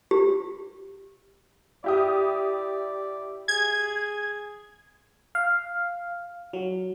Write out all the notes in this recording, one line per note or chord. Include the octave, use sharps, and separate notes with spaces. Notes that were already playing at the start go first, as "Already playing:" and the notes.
G4
E4 G4 D5 D#6
G#4 G#6
F5
F#3